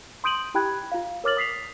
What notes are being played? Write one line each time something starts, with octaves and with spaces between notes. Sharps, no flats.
C6 D#6 G6 D7 D#7 F#7
E4 G4 G5 B5 F#6 G#6
F4 F5
A#4 C#5 D6 F6 A6 F#7
D#6 B6 C7 F7